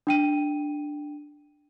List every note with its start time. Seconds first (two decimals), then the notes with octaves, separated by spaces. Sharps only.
0.07 D4 G5 D#7